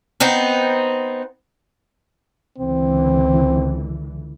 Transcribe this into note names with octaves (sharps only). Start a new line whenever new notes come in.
B3 C4 D#4
C#2 D3 E3 C4